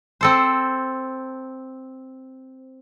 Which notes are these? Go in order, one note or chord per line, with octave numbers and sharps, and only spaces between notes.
C4 A4 C5